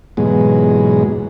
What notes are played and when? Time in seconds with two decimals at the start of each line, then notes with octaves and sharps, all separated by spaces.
0.17 E2 G#2 B2 F#3 G#3